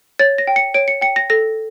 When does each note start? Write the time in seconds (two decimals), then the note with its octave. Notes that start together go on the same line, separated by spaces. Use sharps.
0.19 C#5 A6
0.38 A#6
0.47 G5
0.56 C#7
0.74 C#5 D7
0.88 C#7
1.01 G5 C#7
1.16 A#6
1.30 A4 A#6